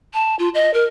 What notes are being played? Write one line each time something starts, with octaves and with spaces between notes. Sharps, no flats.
A5
F4
D#5
A#4